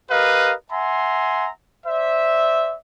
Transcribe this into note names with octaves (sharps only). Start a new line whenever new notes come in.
G4 A#4 B4 D#5 F5
E5 F#5 G#5 A#5 C6
C5 D5 E5